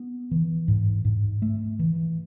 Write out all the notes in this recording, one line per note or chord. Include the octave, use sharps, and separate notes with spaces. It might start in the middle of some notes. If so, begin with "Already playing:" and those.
Already playing: B3
E3
G#2
G#2
A3
E3